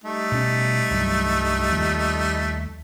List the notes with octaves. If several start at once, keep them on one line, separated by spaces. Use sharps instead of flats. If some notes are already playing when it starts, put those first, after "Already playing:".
G3 A3 D#4
B2 C#4
C2 G2 F#3
D#2 F3 A#3